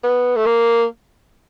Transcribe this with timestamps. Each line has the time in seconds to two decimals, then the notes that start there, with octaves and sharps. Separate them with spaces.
0.03 B3
0.36 A3
0.46 A#3